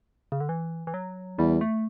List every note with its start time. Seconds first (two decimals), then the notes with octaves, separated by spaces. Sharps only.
0.32 C#3
0.40 D3
0.49 E3
0.87 E3
0.94 F#3
1.38 E2 G3
1.61 A3